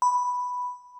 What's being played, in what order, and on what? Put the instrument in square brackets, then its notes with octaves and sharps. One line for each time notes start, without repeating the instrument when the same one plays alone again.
[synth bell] B5